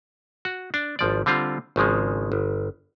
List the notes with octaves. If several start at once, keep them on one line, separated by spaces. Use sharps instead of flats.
F#4
D4
G#1 F3 D5
D3 G3 C4 F4
G#1 C#3 F3 G#3
G1